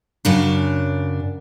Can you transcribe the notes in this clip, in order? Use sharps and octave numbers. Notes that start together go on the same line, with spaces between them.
F#2 C#3 D4